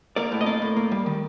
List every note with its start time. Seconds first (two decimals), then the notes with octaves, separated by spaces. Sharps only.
0.16 A#3 A#4 D5
0.32 A2
0.41 D#5
0.46 A#3 A#4 D5
0.62 A2
0.76 A#3
0.92 G3
1.06 D#3